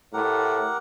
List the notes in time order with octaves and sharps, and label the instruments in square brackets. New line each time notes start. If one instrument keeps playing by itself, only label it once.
[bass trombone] A2 [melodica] G4 A#4 F#5